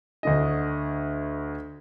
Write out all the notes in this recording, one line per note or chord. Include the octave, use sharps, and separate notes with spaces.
D2 D3 D#5